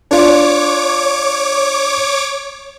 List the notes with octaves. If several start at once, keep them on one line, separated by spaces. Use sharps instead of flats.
D4 F4 C#5 D6